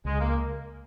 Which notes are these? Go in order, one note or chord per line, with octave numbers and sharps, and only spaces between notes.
C#2 G#3
A#3